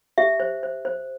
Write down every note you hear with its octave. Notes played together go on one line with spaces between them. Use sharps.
G4 E5
C5
C5
C5